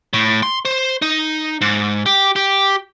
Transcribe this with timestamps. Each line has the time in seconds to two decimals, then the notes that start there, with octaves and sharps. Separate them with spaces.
0.13 A2
0.43 C6
0.65 C5
1.02 D#4
1.61 G#2
2.06 G4
2.36 G4